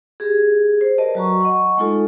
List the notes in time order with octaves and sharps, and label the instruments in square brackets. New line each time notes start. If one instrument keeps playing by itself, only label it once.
[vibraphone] G4 G#4
C5
A#4 B4 D5 D#5 A5
F#3 F#4 A#5 C#6
D#5 F#5 C#6
G#3 A3 D#4 F4 A4